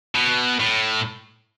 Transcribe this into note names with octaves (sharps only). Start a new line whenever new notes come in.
B2
A2